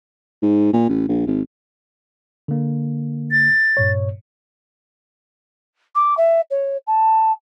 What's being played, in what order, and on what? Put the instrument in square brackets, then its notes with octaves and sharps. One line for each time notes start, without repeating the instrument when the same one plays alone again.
[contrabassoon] G#2
A#2
A1
A#1
G#1
[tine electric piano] D3 A#3
[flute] A6
[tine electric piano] G2 A#2 C#5
[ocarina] D6
E5
C#5
A5